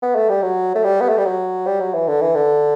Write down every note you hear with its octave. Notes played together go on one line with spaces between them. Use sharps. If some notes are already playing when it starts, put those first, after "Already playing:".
B3
A3
G3
F#3
A3
G3
B3
A3
G3
F#3
G3
F#3
E3
D3
E3
D3